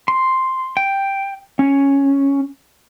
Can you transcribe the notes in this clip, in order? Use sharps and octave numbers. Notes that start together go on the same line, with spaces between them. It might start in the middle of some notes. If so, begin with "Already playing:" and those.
C6
G5
C#4